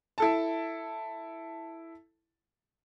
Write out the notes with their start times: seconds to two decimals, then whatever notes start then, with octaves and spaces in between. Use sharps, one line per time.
0.18 E4 A4 A5